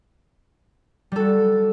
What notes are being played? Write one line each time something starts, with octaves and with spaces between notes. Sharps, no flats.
G3 F#4 A4